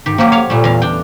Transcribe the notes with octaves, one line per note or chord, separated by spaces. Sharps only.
G#2 D#3 G4
F3 F#3 A#3 G4
C#5 F5
A#2 G3 A3
E2 F5
D4 G5